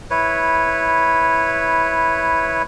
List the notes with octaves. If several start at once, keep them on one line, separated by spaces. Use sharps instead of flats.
E4 B4 C#5